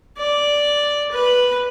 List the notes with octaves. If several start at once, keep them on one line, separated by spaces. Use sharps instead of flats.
D5
B4